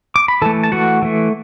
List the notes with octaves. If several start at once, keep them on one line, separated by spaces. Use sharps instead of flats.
D6
B5
E3 A3 A4 A5
A5
E3 A3 F#4 F#5
E3 A3